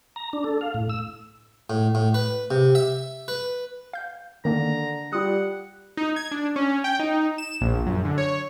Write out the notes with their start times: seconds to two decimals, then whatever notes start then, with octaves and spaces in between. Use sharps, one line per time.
0.16 A#5
0.33 D4
0.44 A4
0.61 F5
0.74 A2
0.89 E6
1.70 A2
1.95 A2
2.14 B4
2.51 C3
2.75 E5
3.28 B4
3.93 F5 G6
4.45 D3 D#3 A#3 D4 A#5
5.13 G3 F4 F#5 D#6
5.97 D#4
6.16 G#6
6.31 D4
6.56 C#4
6.84 G5
6.99 D#4
7.38 E7
7.61 A#1
7.86 F#2
8.05 D3
8.18 C#5